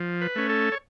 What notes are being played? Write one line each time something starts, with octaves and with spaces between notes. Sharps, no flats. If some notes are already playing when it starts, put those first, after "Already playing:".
Already playing: F3
B4
A3 C#4
A4
C#5